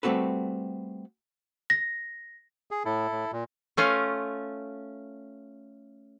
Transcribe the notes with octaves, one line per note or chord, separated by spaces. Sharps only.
G3 A3 C4 F#4 A4 B4
A#6
G#4
A2 E4 A4
A2
A#2
A3 C#4 F4